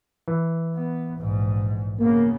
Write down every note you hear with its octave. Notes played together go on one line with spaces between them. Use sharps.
E3
B3
A#1 G#2
C#3 A#3 B3